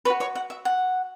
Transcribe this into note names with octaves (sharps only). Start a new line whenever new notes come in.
F#4 B4 C#5 B5
C#5 C#6
F#5
E5
F#5